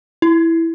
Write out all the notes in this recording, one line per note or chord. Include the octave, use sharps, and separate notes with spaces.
E4